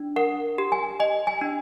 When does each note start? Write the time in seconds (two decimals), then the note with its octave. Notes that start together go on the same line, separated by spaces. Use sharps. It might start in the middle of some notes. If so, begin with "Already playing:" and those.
Already playing: D4
0.16 A#4 F#5
0.58 G4
0.72 G#5
1.00 D#5 G#5
1.27 G#5
1.41 D4